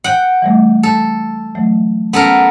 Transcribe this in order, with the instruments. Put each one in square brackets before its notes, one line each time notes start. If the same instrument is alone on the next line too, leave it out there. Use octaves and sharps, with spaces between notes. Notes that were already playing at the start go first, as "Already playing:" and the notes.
[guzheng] F#5 G5
[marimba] E3 G3 A3
[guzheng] A4
[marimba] E3 F#3 A3
[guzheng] B3 A4 A#4 [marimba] C#4